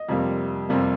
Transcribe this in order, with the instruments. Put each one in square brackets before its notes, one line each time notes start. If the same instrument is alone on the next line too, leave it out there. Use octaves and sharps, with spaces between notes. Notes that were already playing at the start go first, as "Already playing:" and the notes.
Already playing: [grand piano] D#5
F2 C3 G3 A#3
F2 C3 G3 A#3